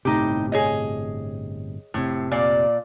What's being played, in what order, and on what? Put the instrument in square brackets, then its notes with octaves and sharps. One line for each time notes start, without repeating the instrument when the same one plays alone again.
[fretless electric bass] G1 A2 C3 [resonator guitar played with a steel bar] D#4 G4
[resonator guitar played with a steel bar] G#4 C#5 D#5
[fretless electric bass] F1 C3 [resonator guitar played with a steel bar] A2
[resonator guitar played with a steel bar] A#2 D5 F5